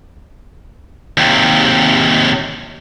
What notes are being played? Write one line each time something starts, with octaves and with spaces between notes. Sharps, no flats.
D#2 C3